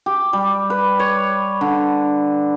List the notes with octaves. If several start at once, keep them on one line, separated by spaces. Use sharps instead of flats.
G4
G3
B4
C#5
D3